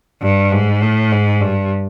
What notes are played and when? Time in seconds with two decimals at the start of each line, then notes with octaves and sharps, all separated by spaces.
0.22 G2
0.52 G#2
0.82 A2
1.12 G#2
1.41 G2